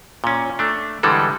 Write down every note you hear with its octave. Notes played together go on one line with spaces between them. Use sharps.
A#2 C#4
A3 D4
D3 E3 G3 G#3 A4